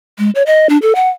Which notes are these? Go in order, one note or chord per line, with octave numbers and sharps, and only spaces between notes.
G#3
C#5
D#5
D4
A4
F#5